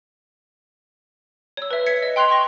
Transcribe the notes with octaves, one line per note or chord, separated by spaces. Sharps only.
C#5 E6
B4 E5
G#6 B6 C#7
D#5
G5 C6 F#6 C7 F7
C6 C#6 A#6